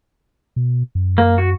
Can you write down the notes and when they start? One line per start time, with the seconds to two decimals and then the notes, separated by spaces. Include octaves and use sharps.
0.56 B2
0.95 F#2
1.18 A#3
1.38 F#4